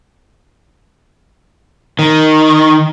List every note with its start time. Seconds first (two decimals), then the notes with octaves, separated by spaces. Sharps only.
1.99 D#3